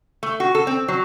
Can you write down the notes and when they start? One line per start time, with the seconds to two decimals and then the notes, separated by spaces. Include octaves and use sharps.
0.23 A3
0.40 F#4
0.55 A4
0.67 C4
0.88 F#3